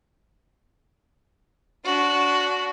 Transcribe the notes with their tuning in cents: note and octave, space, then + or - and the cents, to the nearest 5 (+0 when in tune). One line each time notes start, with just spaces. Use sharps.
D4 -25 F#4 +0